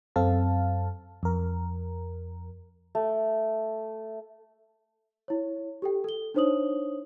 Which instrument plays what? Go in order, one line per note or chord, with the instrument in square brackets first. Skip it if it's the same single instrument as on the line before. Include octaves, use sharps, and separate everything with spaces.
[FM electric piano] F#2 C4 A4 F5 A5
F2 A#4
[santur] A3
[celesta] E4 C#5
G4 A4 G5
A4 G7
D4 D#4 C5 C#5 D#6 F#7